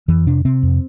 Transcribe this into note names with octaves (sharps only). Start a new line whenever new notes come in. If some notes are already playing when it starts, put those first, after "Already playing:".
F2 E3
C3 D4
C3 C4
F2